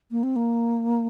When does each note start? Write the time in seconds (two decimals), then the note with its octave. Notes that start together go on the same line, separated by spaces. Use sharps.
0.11 A#3
0.23 C4
0.36 A#3